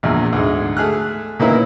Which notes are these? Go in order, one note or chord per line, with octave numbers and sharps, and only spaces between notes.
A#1 E2 A#2
D2 G#2 G#3
A3 G#4 F6 F#6
A#2 D#3 A#3 B3 C#4 E4